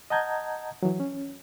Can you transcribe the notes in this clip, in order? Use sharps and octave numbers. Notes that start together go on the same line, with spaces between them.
D#5 F#5 A5 A#5 G6 G#6
E3 F#3
C#4